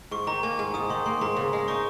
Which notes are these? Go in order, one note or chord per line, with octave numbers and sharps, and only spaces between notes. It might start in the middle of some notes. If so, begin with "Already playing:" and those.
G#2 C#6
D#3 A#5
A#3 G#5
G#2 G#5
G#2 D#6
D#3 C6
A#3 C6
G#2 A#5
C#3
G#3
D#4 C#6